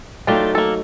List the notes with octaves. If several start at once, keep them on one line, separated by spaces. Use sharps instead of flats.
F#3 A3 D4 D#4 F4 G4
A#3 A4